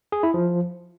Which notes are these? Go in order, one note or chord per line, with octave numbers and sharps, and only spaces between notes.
G#4
E4
F3